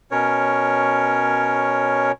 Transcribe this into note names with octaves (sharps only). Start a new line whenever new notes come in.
B2 C#4 A#4 C#5